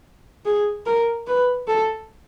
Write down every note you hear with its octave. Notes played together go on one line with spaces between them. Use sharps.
G#4
A#4
B4
A4